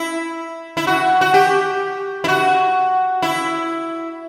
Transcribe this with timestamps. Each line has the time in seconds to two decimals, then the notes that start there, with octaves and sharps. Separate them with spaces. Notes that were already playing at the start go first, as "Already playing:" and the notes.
Already playing: E4
0.77 E4
0.87 F#4
1.21 F#4
1.34 G4
2.24 E4
2.28 F#4
3.22 E4